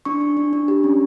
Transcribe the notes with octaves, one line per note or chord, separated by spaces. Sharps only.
D4 C#6
D4
D4
D4
G4
C#4